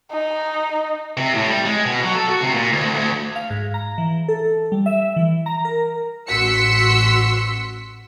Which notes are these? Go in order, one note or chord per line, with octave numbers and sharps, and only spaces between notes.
D#4
C3
A2
G3
G#3
B2
F#3
A4
F#4
C3
A#2
D2
D2
F5
G#2
A#5
E3
A4
G3
E5
E3
A#5
A#4
A1 F#4 C6 E6 B6 C#7